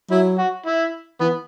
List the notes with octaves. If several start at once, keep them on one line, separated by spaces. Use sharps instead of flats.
F#3 E4
F#4
E4
E3 B3